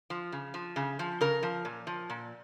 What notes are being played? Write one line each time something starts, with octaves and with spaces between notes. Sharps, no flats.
F3
C#3
F3
C#3
F3
C#3 A#4
F3
A#2
F3
A#2